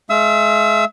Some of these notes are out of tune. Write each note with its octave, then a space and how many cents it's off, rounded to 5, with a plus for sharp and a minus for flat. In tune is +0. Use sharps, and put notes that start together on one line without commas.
G#3 +35 E5 +40 E6 -30